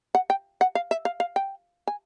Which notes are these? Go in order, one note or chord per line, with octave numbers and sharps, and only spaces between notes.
F#5
G5
F#5
F5
E5
F5
F5
G5
G#5